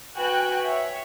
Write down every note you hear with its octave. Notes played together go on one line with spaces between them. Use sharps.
F#4 B4 G5 G#5 F#6
C#5 E5